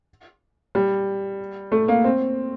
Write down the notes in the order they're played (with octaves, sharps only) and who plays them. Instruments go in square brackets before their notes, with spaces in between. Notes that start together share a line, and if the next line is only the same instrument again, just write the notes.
[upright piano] G3
A3
A#3
C4